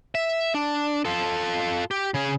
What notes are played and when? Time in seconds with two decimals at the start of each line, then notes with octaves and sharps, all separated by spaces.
0.15 E5
0.54 D4
1.05 F4 A4
1.91 G4
2.14 C#3 G#4